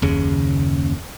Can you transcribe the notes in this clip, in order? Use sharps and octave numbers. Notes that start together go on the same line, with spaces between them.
F#1 D#2 C#3